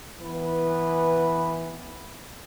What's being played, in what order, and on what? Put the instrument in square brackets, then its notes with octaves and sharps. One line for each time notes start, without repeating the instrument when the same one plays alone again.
[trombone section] E3 B3 B4